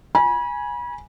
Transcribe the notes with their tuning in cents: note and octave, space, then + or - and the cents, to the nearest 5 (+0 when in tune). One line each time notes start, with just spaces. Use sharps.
G#5 +0 B5 -35